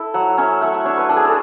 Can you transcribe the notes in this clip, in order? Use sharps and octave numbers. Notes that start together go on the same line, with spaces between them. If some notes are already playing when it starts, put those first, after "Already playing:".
Already playing: E4 A4
F#3 F#5
C#4 E5
A3 F#5
E5
D4 C#5
B4
D4 A4
G#4
A4